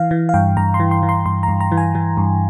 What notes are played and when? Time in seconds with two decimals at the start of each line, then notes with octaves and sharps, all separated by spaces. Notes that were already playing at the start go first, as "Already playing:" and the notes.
Already playing: E3 F5
0.11 E3
0.29 F5
0.34 G2 G5
0.57 G2 A#5
0.74 C6
0.80 E3
0.91 C6
1.03 E3
1.09 C6
1.26 G2 C6
1.43 A#5
1.48 G2
1.61 A#5
1.72 E3
1.77 G#5
1.95 E3
2.17 G2